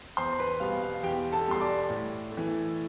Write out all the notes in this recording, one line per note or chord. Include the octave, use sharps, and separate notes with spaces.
E2 C5 C6
B4 B5
B2 G3 B3 F5
F5
E2 G4 G5
A4 A5
B2 G3 B3 C6
D5 D6
A2
A3
E3